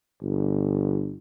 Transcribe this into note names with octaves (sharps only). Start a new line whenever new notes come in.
G1